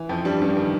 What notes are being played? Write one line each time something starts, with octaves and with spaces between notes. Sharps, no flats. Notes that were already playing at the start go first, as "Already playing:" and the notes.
Already playing: E3
F2 F3
G2 G3
G2 G3
D#3